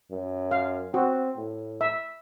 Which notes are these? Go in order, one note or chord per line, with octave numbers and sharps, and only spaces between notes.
F#2
F5
C4 F#4
A2
E5